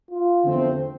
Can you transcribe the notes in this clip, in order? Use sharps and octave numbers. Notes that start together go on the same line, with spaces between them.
F4
E2 D3 F3 A3 C4